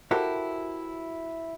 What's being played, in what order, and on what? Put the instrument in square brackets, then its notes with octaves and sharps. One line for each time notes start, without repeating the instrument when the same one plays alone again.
[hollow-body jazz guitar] E4 F#4 G4 A4 A#4 C5